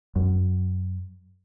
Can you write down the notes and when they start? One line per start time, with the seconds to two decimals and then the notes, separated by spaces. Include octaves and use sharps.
0.16 F#2